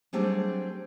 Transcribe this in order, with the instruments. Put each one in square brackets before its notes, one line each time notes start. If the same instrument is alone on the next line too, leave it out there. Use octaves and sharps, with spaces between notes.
[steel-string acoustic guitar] F#3 G3 A3 C4 D4 G#4